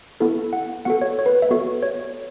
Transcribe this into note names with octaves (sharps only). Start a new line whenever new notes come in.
B3 E4 A4
F#5
B3 F#4 A4 F#5
C#5
C#5
B4
E5
B3 F#4 A4
C#5